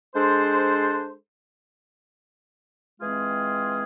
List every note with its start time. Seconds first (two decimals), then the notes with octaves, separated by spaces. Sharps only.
0.14 G#3 D4 A4 C5
3.00 E3 G#3 C4 F4 G#4